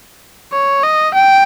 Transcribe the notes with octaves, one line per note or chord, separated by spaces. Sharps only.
C#5
D#5
G5